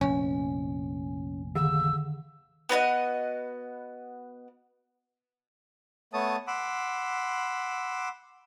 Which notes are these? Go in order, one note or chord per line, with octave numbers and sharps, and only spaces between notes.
F1 A#1 C#4 G#5
D3 D#3 E6
B3 F#4 C#5 D#5
A3 B3 C#5 A5 D#6
F#5 B5 C6 D6 E6